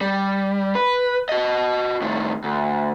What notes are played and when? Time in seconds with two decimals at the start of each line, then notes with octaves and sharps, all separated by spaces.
0.01 G3
0.75 B4
1.29 F#4 D#5
2.02 A2 D#3
2.44 D2